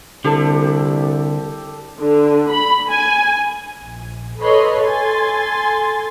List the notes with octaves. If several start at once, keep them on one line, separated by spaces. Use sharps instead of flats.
C2 D3 G4 A4
D3
B5
G#5
A#1
A4 B4 C#5 D#5 B5 C6
A4 G#5 C6 A6